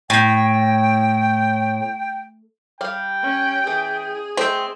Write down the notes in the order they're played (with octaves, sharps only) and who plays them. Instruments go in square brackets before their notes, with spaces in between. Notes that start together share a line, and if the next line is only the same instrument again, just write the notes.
[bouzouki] A2 [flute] G5
[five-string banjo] G3 F5 [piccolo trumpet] G5
[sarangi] C#4
[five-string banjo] E3 [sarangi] G#4
[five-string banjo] A3 D#5 G5 [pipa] C4